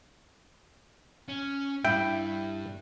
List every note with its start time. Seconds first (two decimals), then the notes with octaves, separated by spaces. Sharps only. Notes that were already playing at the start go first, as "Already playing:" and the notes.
1.28 C#4
1.85 G2 E4 G5